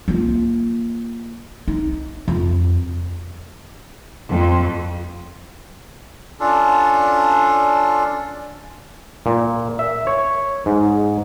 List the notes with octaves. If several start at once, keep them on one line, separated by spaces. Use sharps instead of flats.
A#3 F4
D#4
F2
F2
C#4 D4 F4 A4
A#2
E5
C#5
G#2